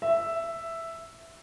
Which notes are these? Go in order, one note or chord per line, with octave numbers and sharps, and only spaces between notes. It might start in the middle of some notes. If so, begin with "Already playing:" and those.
E5